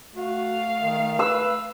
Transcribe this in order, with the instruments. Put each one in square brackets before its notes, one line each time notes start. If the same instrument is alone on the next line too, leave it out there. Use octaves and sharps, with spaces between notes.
[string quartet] A3 F5 [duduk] F#4
[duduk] D#3
[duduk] B4 [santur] E6